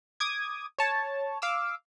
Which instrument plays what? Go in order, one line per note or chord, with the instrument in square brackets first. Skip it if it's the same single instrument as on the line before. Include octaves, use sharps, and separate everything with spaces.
[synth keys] D6 D#6 G#6
C#5 A5
F5 D6 E6